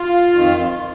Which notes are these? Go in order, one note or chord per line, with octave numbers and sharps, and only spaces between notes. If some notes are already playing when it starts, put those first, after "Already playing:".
Already playing: F4
F2 D#3